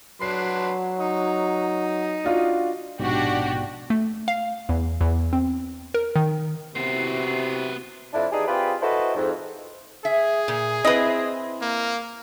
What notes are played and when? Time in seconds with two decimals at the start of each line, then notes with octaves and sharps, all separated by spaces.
0.22 F#3 D4 B4 C6 C7
0.99 D#4
2.24 D4 F4 F#4
3.00 A#1 G#2 B2 D4 F#4 G4
3.90 A3
4.28 F5
4.69 E2
5.01 E2
5.33 C4
5.94 A#4
6.16 D#3
6.75 C3 B3 E4 F#4 C5 C7
8.13 F2 D4 E4
8.32 E3 D4 D#4 G4 G#4
8.48 C4 F4 G4 G#4 B4 D5
8.82 E4 F#4 A4 B4 C5 D#5
9.15 F2 G#2
10.05 G#4 E5
10.48 A#2
10.85 C4 E4 B4 D#5
11.62 A#3